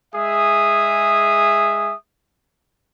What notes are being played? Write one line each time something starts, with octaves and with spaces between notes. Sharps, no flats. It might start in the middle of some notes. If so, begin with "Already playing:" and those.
G#3 G#4 E5 D#6